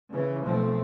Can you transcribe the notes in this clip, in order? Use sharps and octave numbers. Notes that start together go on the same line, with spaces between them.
C#3 E3
B1 F3 A3 C4